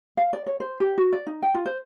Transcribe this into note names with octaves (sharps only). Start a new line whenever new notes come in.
F5
D5
C#5
C5
G4
F#4
D5
D#4
G5
F4
C5